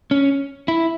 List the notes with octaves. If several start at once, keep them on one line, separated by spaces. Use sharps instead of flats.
C#4
E4